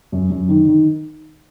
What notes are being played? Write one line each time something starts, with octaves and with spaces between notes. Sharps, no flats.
F#2
F#2
D#3
D#3